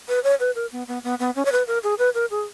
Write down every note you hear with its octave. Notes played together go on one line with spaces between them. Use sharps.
B4
C#5
B4
A#4
B3
B3
B3
B3
C#4
C#5
B4
A#4
G#4
B4
A#4
G#4